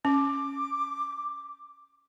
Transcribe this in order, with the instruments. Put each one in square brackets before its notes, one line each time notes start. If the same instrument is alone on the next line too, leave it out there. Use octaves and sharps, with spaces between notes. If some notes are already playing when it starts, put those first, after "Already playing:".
[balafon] C#4 [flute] D6